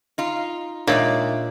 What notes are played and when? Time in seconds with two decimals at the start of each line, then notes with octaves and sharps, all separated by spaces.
0.18 D#4 F4
0.87 A#2 G#3 D4 D#4 C#5 D5 E5